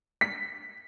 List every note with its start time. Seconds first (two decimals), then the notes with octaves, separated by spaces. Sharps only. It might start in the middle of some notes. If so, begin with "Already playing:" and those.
0.21 B6